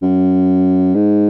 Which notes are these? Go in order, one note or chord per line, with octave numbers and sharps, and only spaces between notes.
F#2
G#2